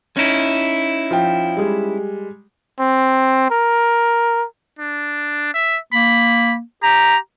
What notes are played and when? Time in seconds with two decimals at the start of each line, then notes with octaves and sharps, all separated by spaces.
0.17 C#4 D#4 E4
1.11 F3 G5
1.57 G3 G#3
2.80 C4
3.51 A#4
4.79 D4
5.54 E5
5.93 A#3 B5
6.83 G4 A#5